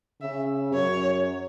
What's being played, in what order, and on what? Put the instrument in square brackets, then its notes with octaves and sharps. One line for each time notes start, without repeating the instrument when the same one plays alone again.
[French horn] C#3 [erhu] E5
[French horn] F#2 [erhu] C#5